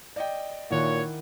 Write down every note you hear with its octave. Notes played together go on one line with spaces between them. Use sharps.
D5 D#5 G5
A#2 D#3 E4 C#5 F#5